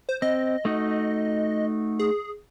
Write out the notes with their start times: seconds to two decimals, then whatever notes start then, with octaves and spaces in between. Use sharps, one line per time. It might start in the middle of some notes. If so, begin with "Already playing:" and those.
0.09 C5
0.22 C4 D#5
0.65 A3 D#4 F#4
1.99 G#4